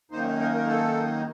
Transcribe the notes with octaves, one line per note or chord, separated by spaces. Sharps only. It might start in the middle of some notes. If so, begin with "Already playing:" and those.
F#2 D#3 A#3 D#4 C5
A#4
A#4
A4